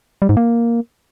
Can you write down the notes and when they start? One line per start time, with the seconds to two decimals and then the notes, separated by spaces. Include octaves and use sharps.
0.22 G3
0.29 G#2
0.37 A#3